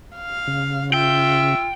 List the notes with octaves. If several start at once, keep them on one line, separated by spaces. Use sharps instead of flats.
F5
C#3
F4 E5 G5